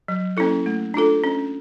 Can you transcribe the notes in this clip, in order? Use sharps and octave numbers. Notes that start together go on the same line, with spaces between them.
F#3
A#3 C#4 E4 A4
A3
D4 F4 A4
C#4